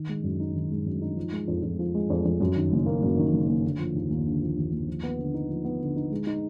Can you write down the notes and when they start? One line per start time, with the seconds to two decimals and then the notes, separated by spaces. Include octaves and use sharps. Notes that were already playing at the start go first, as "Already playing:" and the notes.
Already playing: D#3
0.09 G#3
0.24 F#2
0.40 D#4
0.55 D#3
0.71 G#3
0.86 F#2
1.02 D#4
1.16 F3
1.32 G#3
1.48 F2
1.63 F2
1.79 F3
1.95 G#3
2.10 F2
2.25 F2
2.40 F#2
2.56 D#3
2.72 F#1
2.86 A#3
3.03 F#2
3.17 D#3
3.33 F#1
3.48 A#3
3.64 D3
3.79 F3
3.95 D#2
4.10 D#2
4.26 D3
4.42 F3
4.57 D#2
4.72 D#2
4.88 F3
5.03 B3
5.19 D3
5.34 D#4
5.50 F3
5.64 B3
5.81 D3
5.96 D#4
6.11 G#3
6.27 D#4